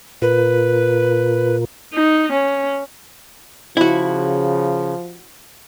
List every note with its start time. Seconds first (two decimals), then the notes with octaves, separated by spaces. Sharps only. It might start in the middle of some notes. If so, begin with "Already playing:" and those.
0.22 A#2 F4 A#4 B4
1.94 D#4
2.32 C#4
3.77 C#3 F3 E4 F#4